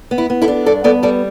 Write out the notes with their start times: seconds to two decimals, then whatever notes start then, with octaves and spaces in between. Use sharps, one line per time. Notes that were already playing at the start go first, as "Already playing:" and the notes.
0.11 B3
0.18 E4
0.30 B3
0.42 E4 A4
0.48 D4
0.66 G2 A4 D5
0.84 B3 A4 D5
1.03 G3 A4 D5